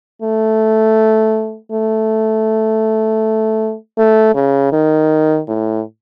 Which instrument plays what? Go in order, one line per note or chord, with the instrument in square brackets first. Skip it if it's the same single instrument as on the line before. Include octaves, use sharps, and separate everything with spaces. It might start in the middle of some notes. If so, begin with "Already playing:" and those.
[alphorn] A3
A3
A3
C#3
D#3
A2